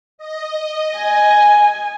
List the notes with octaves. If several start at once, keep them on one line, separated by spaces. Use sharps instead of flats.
D#5
G#5